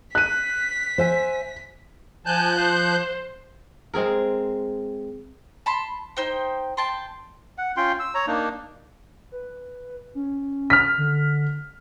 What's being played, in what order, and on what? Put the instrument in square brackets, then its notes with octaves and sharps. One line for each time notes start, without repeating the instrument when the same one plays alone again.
[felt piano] F#6 D#7 [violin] B6
[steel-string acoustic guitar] C5 E5 G#5
[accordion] F3 F#6 G6 [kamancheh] G#5 A5
[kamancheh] C5
[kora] G#3 C4 G#4 A#4
[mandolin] A5 B5 C6
D#4 C5 G5
G5 A5 C6
[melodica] F#5
C#4 F4 G5 C6
E6
C#5 A#5
A#3 D4 D#4
[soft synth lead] B4
C#4
[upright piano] F6 B6
[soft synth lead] D3